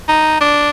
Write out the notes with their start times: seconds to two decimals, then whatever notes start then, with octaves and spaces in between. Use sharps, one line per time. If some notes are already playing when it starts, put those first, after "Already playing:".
0.08 D#4
0.41 D4